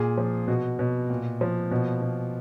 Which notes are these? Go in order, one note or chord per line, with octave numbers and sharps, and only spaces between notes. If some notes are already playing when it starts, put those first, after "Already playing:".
Already playing: A#2 G#4
F3
B2 F#4
B2
A#2
F3
B2
B2